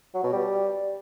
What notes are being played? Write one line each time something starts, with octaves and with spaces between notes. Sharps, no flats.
F#3
B2
G3